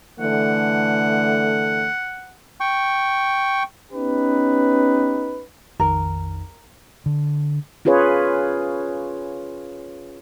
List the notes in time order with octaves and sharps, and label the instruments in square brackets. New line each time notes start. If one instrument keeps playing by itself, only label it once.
[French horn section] D3 E3 A3 [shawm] F#5
[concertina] G5 C#6
[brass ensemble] B3 C#4 D#4 G4 B4
[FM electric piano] A#1 F2 D#3 [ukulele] A#4
[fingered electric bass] D3
[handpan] C#4 F4 G#4 B4 C#5